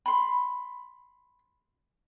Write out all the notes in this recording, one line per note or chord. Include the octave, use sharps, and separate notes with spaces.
B5 C6